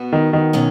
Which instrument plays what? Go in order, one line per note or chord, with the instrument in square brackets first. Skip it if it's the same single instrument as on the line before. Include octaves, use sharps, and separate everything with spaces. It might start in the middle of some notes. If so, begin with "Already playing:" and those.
Already playing: [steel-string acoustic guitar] B2 B3 F#4
[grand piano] D#3
D#3
[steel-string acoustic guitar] B2 F#3 C#4